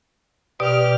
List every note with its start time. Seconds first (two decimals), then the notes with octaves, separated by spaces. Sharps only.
0.60 B2 G4 D5 F6